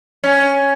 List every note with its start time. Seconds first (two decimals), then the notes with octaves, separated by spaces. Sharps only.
0.24 C#4